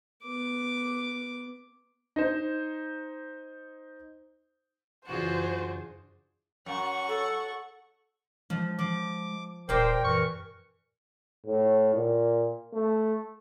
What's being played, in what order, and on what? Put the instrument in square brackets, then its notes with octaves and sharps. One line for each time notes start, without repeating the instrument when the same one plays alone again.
[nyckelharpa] B3 D6
[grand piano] D#4 C5
[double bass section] F#2 C#3 E3 [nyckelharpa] D4 G#4 [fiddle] F4 F#4 [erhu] C5
[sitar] F#2 [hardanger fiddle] F#5 C#6
[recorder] A4
[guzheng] F3 [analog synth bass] G#3
[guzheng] F3 [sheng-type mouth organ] D6
[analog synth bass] D#1 [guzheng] A#2 G4 [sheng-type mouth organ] A#4 G5 [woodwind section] C5
[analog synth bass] F#2 [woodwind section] E3 A#4 C#6
[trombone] A2
A#2
A3